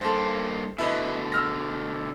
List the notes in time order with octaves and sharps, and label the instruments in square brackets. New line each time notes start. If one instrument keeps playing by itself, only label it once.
[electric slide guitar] G2 A#3 [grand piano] A4 C5
[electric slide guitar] B2 D3 [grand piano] E4 B4 D#5
[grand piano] E6 F6 A#6